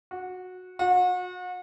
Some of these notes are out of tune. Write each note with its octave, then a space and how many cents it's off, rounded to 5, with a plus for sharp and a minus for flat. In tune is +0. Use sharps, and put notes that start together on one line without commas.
F#4 -15
F#4 -35